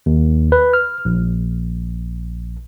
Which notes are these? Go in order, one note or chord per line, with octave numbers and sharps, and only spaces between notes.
D#2
B4
F6
A#1